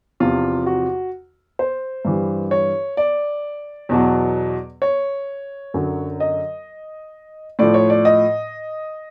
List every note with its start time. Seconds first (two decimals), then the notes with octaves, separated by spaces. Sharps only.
0.20 E2 C3 F3 F4
0.66 F#4
1.59 C5
2.05 G2 E3 G3
2.51 C#5
2.97 D5
3.89 E2 B2 F#3
4.82 C#5
5.74 F#2 D3 F#3
6.20 D#5
7.59 A2 F3 D5
7.74 C#5
7.90 D5
8.05 D#5